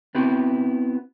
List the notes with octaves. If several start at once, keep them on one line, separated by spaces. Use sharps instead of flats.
B3 C4 E4 F#4